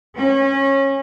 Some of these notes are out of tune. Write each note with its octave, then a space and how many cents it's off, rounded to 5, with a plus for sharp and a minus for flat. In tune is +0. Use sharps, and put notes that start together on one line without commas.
C#4 -25